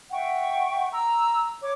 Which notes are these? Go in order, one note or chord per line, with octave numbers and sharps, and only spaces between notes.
E5 F#5 G5 C#6
A#5 E6
C#5 D6